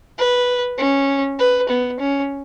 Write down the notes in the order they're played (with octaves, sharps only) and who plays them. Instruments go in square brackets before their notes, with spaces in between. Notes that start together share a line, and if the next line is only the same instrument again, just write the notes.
[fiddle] B4
C#4
B4
B3
C#4